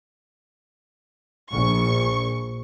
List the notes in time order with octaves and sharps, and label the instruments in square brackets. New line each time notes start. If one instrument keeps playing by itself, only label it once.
[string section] A#1 C#6